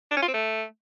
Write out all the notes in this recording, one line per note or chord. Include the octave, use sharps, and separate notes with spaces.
D4
C#4
F4
C4
A3